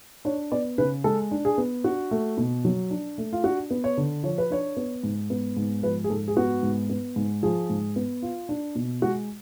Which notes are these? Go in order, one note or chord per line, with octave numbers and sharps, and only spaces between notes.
D4 C#5
B3 D5
C#3 B4
G#3 A4
D4
G#4
B3
D4 F#4
A3
B2
F#3
D4
A3
F4
D4 F#4
B3
C#5
D3
F3 C#5
B4
D4 C#5
B3
G#2
B3
G#2
F3 B4
G#4
G#2 A4
G#4
B3 F#4
G#2
B3
G#2
F3 G#4
G#2
B3
F4
D4
B2
G#3 F#4